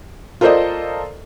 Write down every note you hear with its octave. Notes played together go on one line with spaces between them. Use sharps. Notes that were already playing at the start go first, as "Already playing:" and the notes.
F4 A4 A#4 C5 D5 D#5